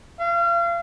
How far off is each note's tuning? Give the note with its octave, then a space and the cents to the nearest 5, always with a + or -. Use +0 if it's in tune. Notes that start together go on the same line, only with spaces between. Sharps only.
F5 -35